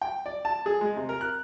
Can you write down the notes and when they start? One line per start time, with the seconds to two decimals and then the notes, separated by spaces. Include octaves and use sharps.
0.01 G5
0.26 D5
0.45 A5
0.66 G#4
0.81 G#3
0.96 C3
1.09 A#4
1.21 F#6